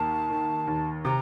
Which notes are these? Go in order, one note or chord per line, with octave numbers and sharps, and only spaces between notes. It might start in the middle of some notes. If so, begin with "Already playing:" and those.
Already playing: D#2 A#3 A5
D#3
D#2
C3 A#5